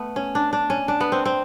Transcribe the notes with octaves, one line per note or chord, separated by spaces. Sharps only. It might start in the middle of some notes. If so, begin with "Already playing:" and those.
Already playing: A3 B3
C#4
D4
D4
C#4
D4
B3
C4
C4